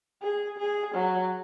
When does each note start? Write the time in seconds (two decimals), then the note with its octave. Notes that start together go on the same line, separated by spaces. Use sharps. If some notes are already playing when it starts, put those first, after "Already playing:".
0.22 G#4
0.58 G#4
0.95 F#3